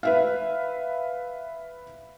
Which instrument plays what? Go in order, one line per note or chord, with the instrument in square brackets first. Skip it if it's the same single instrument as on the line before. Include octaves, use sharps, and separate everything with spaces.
[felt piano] B4 E5 F5